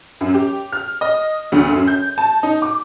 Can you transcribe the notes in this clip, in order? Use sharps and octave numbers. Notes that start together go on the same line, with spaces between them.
F#2
G4
F6
D#5
D2
F#2
G6
A5
D#4
D6